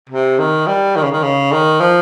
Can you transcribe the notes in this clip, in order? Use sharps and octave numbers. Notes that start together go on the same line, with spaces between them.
C3
D#3
G3
D#3
C#3
D#3
C#3
D#3
F3